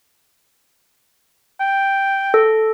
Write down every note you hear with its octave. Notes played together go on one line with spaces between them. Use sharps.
G5
A4